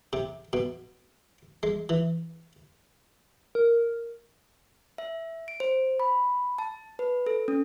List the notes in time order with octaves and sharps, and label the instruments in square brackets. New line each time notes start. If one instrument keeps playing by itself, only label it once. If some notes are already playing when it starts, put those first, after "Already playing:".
[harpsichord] C3
B2
G#3
E3
[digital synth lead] A#4
[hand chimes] E5
D7
C5
B5
A5
B4
A4
C#4